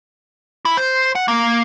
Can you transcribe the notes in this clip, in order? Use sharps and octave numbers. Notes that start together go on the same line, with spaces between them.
E4
C5
F#5
A#3